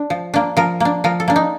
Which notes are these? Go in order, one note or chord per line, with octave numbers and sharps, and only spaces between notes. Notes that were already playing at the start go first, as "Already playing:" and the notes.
Already playing: D4
F3
A#3 D4
F3 A#4
A#3 D4
F3 A#4
A4
A#3 D4
D#4